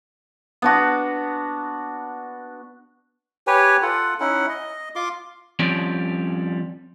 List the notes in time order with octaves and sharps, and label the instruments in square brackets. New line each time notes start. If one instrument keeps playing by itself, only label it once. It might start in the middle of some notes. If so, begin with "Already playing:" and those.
[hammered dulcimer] B3 D4 F#4
[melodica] G4 B4 C#5 G#5
F4 A4 F#5
C#4 D#4 E4 F#5
D#5
F4 C6 D6
[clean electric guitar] F3 G3 C4 C#4 D5